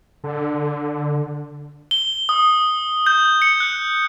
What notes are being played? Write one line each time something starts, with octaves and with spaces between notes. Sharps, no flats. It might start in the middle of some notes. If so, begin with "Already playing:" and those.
D3
G7
D#6
G6
C#7
F#6